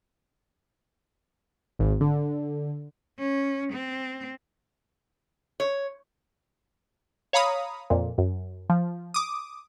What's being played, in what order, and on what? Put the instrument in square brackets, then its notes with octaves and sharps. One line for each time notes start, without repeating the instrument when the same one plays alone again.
[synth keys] G#1
D3
[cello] C#4
C4
[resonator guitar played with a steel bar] C#5
[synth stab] C#5 F5 A#5 B5 D#6
F2 A#2
F#2
F3
D6 D#6